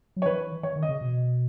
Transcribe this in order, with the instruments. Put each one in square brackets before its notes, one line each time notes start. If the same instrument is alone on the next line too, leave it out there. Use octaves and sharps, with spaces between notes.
[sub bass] F#3
[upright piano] C#5
[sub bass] E3 [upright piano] B4
[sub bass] E3 [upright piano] C#5
[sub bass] D#3
[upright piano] D#5
[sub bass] C#3
B2